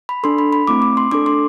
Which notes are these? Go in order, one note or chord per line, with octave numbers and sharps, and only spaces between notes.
B5
D4 A4 C6
B5
B5
A3 C4 E4 D6
D6
C6
D4 A4 D6
C6